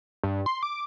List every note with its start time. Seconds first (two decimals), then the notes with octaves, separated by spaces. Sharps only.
0.24 G2
0.46 C6
0.63 D6